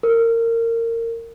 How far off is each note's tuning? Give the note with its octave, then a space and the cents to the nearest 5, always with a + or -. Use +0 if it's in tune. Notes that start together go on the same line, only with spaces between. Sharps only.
A#4 -25